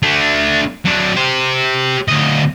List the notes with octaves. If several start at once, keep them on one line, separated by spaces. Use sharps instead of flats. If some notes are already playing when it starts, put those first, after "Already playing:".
A3 D4
F#3 D4
G4 C5
D2 D#5